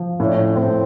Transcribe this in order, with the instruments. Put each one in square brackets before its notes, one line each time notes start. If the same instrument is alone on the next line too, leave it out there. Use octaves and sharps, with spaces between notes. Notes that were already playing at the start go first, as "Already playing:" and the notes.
Already playing: [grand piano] F3
[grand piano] A2 [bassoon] C#4
[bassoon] D4
C#4
[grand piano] A2 [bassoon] C4